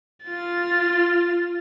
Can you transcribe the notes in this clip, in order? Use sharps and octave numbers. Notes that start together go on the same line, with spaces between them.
F4 A6